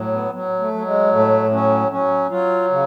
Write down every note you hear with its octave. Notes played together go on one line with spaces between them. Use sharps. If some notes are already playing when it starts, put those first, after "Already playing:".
Already playing: A2 F#3
B3
F#3
A3
F#3
G#3
A2 A3
F#3 C#4
F#3 C#4
F#3 F4
C#3